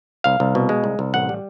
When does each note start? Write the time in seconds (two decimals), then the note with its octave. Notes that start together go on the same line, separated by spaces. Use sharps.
0.24 C2 F5
0.40 C2
0.55 B2
0.69 G#3
0.84 C2
0.99 C2
1.14 A1 F#5
1.29 G3